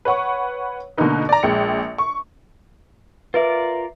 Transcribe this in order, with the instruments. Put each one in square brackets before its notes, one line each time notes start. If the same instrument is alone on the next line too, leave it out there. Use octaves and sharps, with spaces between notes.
[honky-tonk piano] B4 C#5 F#5 C#6
B2 D3 A3 A#3 D#4 B4
D5 A#5
A#1 G#3 G5 C#7
C#6
[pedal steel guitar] F4 A#4 D5 [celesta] B4 E5